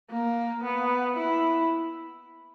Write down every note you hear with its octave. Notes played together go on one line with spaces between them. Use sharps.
A#3
B3
E4